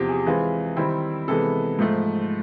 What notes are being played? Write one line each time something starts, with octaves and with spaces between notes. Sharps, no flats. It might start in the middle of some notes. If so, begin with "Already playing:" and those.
Already playing: E2 C3 F3 G4
G#4
E3 G#3 C4 F4
D#3 G3 C4 E4
C3 E3 G#3 B3 A4
G#2 F3 A3